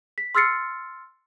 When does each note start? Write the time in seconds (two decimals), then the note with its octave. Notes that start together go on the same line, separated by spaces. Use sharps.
0.18 B6
0.35 C6 E6 F6 A6 C7 C#7